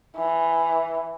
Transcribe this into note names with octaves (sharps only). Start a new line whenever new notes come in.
E3